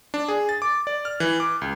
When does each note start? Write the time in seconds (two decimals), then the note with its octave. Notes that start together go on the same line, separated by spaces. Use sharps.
0.14 D4
0.28 G#4
0.49 A6
0.62 D6
0.87 D5
1.05 F6
1.20 E3
1.40 D6
1.61 C#2